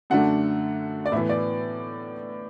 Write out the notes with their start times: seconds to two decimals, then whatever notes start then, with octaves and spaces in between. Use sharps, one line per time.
0.10 F#2 D3 A3 D4 F#5
1.06 D5
1.12 A2 E3 B3 E5
1.29 D5